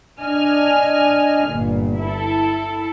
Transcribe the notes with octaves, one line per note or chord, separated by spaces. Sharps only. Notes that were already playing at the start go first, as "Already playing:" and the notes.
D4 D#5 G#5 F6
G1 A#2
E4 A4